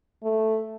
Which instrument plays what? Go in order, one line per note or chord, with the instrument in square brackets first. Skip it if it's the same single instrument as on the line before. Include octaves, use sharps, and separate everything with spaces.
[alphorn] A3